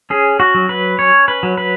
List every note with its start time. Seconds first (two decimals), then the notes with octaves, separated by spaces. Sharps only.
0.10 C#4 G#4
0.40 F#4
0.55 F#3
0.69 B4
0.99 C#4 C#5
1.28 B4
1.43 F#3
1.57 B4